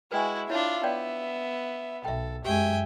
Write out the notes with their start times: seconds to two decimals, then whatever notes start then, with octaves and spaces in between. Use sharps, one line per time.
0.12 G#3 E4 F#4 B4 G5 G#5
0.50 D4 E4 F4 C#5 E5
0.83 B3 C#5 D5 G5
2.05 B1 A4 E5 G5
2.45 F#2 G#3 G4 E5 G5 G#5 D6